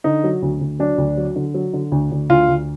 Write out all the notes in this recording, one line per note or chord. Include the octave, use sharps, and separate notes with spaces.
D3 D#4
F#3
D2
D2
F#3 D4
D2
F#3
D3
F#3
D3
D2
D2
D2 F4
D2